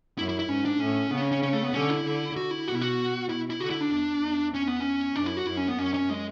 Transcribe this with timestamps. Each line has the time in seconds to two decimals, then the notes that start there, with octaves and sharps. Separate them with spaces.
0.18 F#2 E4
0.29 E4
0.39 E4
0.49 G#2 C#4
0.65 D4
0.80 A2 C#4
1.11 C#3 B3
1.21 C#4
1.32 C#4
1.43 C#4
1.53 A3
1.63 B3
1.74 D3 C#4
1.90 E4
2.05 D3
2.36 F#4
2.51 E4
2.67 B2 F#4
2.75 E4
2.82 F#4
3.29 B2 E4
3.50 E4
3.61 D3 F#4
3.70 E4
3.81 D4
3.92 E2
4.22 E2
4.54 C#4
4.67 B3
4.80 C#4
5.16 F#2 D4
5.26 E4
5.37 F#4
5.47 F#2 E4
5.57 C#4
5.68 B3
5.78 F#2 C#4
5.94 C#4
6.10 G#3